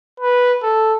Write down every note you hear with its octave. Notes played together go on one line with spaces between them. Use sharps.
B4
A4